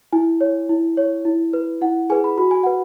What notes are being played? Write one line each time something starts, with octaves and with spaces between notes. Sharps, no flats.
E4 G#5
C#5
E4
C#5
E4
B4
E4 F#5
G#4 B4 G#5
B5
F#4 B5
G#5
B4 F#5